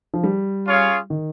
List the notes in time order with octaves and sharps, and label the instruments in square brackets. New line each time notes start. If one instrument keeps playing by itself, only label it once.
[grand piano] F3
G3
[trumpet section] C#4 F4 G#4 C#5 F5
[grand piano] D#3